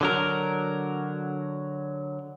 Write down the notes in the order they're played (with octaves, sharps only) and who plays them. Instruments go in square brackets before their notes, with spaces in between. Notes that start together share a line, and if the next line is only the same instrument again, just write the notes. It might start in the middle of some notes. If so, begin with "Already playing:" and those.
[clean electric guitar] D3 F#3 A#4